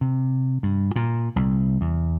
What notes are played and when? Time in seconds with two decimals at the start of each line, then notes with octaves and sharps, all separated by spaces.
0.01 C3
0.63 G2
0.96 A#2
1.36 C2
1.81 E2